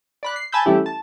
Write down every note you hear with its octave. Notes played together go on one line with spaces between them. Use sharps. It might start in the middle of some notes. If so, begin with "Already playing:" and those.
D5 B5 F#6
C7
G#5 A5 B5 E6 G6
E3 G3 A3 C#4 E4 G4
A5